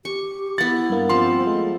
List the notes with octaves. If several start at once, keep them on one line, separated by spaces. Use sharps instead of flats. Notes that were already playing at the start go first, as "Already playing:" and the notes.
G4 C#6
B3 E4 F#5 A6
G2 A#3
F3 C4 A5 C6
G#3 A3